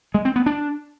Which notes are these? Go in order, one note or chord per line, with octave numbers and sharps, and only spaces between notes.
G#3
C4
B3
D4